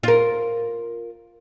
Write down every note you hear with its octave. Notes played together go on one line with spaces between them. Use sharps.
F4 A#4